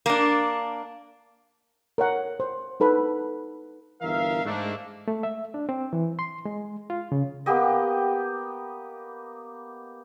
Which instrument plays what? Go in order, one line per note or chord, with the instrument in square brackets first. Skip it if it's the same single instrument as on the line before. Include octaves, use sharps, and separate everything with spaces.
[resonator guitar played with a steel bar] A#3 D4
[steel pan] A#4 C#5 F#5
C5
D#4 A4 B4 B5
[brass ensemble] G1 E3 A#4 E5 F5
G#2 A3 A#3 D4
[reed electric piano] A3
E5
D4
C4
E3
C6
G#3
F4
C#3
[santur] A#3 B3 G4 D#5